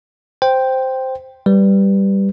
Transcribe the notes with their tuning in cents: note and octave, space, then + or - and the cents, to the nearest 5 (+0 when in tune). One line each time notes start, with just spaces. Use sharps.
C5 +0 G5 +0
G3 +0 B4 +0